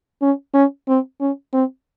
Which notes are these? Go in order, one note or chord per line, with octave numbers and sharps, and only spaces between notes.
C#4
C#4
C4
C#4
C4